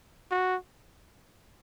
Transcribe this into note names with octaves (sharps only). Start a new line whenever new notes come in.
F#4